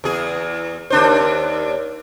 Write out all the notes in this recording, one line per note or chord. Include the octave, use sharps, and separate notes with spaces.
E2 G#4
D#2 D4 C5